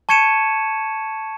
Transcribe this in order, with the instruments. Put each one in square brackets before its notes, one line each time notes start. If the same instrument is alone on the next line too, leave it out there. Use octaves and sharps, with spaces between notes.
[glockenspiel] A5 C#6 G#6 C#7 D#7 E7